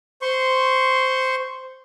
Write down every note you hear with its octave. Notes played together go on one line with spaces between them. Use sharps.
C5 C6 C#6